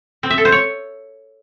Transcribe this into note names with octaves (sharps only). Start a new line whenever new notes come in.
C4
E5
A4
C5
C#5